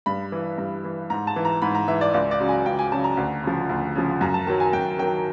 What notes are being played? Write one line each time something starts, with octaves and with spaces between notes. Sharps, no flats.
G2 B5
E3
G2
E3
G#2 A#5
A5
E3
A#5
G#2 B5
A#5
E3 E5
D5
C#2 D5
D5
C#3 F#3
G#5
C#2 G5
G#5
C#3 F#3 A5
A#5
D2
C#3 F3
D2
C#3 F3
F#2 A#5
A5
D#3 F#3 A5
G#5
F#2 G5
D#3 F#3 G5